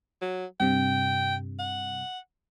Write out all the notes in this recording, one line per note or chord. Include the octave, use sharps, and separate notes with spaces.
F#3
G2 C3 G5
F#5